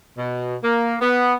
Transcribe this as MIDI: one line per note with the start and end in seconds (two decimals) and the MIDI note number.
0.17 0.55 47
0.63 0.96 58
1.01 1.33 59